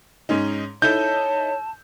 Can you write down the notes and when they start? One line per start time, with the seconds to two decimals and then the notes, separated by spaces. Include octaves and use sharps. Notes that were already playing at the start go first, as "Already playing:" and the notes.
0.29 G#2 C#4 D#4
0.82 D#4 E4 A4 C#5 A5 G6